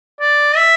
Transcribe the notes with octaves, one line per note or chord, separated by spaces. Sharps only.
D5
E5